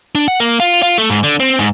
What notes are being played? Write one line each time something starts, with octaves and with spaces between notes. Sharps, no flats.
D4
F#5
A#3
F4
F4
A3
G#2
D3
C4
G#2